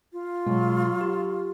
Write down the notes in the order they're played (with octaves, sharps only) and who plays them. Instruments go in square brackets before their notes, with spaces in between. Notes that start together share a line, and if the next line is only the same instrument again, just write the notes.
[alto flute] F4
[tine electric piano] B2 G#3 [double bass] F#3
[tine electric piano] G4